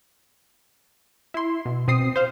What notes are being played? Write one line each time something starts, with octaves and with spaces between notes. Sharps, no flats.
E4 C6
B2
B2 C4 D#6 C7
C5 F5